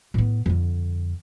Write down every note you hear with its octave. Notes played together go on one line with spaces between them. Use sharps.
A2 B3
F2 D3